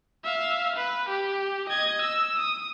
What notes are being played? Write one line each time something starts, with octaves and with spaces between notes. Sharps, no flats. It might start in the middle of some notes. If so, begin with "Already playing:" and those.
E5 F5
B4
G4
D#5 G#6
E6
D#6